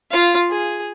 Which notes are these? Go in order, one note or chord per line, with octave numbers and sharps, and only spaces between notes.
F4 F5
G#4